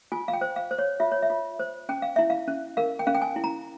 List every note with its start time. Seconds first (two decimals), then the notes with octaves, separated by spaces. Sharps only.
0.12 F4 G#5
0.28 F5
0.33 G5
0.41 C5
0.56 F5
0.71 C5
0.79 C#5
1.00 F4 E5
1.12 C#5
1.23 E5
1.30 F4
1.59 C5
1.89 C#4 G5
2.02 F5
2.16 E4 E5
2.30 F5
2.48 C#4
2.77 A#4 F5
2.99 G5
3.07 C#4 F5
3.14 G5
3.21 G#5
3.36 E4
3.44 A#5